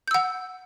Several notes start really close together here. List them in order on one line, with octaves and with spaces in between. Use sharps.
G6 E6 F#5